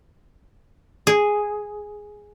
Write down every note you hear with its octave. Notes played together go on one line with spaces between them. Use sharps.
G#4